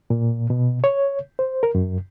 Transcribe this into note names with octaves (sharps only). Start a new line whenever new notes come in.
A#2
B2
C#5
C5
A#4
F#2